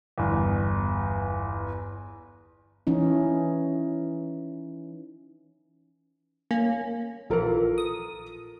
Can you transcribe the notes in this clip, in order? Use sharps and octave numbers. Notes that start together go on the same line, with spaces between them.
G1 E2
E3 C#4 D#4
A#3 C#4
A#1 E3 F4 A4 A#4
D#6